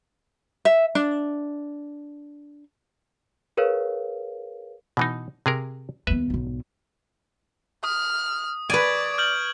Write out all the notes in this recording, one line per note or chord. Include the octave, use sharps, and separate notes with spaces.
E5
D4
G#4 A#4 B4 C#5 F5
B2 E3 D#4
C3 G#4 A#4
D#2 B3 B4 E5
B1 G#2
D#6 F6
B4 D5 G#5 C#6 G#6 D7
F6 G6 F#7